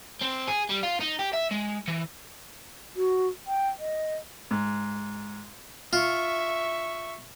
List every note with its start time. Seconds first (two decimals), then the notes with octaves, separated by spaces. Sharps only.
0.22 C4
0.48 G#4
0.70 G3
0.83 F4
1.00 D#4
1.19 G4
1.33 E5
1.51 G#3
1.88 E3
2.96 F#4
3.47 G5
3.79 D#5
4.51 G#2
5.93 F4 E5 C#6